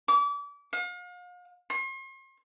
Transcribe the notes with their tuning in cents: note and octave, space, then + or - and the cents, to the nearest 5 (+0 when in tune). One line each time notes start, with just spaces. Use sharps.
D6 -35
F5 +40
C6 +45